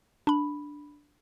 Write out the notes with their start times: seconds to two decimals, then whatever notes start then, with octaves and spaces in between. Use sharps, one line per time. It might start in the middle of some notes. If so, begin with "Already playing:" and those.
0.27 D4 B5